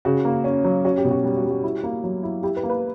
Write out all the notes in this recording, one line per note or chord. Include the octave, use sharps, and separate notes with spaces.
C#3 F#4
A#3
C#4
F#3
C#4 F#4
G4
B2
F#4
G3 G4
F#4
G3
F#4
E4
A#3
F#3
E4
E4 G4
B4
A#3
B4